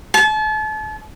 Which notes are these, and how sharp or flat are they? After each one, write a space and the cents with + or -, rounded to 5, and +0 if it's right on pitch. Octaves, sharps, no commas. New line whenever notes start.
A5 -35